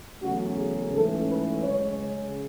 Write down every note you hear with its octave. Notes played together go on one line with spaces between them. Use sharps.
E2 C#3 F#3 A3 C#4 F#4
G#4
G#2 E3 A3 C#4 A4
B4
F#2 C#3 G#3 C#4 C#5